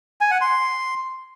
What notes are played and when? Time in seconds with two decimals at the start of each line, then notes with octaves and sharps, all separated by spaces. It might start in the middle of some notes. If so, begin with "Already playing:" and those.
0.21 G#5
0.31 F#5
0.41 C6